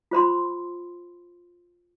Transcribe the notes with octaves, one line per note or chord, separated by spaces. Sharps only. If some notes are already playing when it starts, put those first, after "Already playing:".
F4 C5 B5 C6